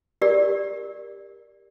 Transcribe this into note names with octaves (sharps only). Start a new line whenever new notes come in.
G4 A#4 D5